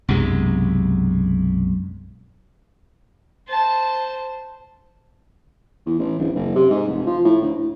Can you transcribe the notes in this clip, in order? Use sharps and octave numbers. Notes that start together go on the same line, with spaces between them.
B1 F#2 C3 G#3
C5 A5
E2
A1
D1
F#1
C3
G#2
F1
F3
A2
D2
A2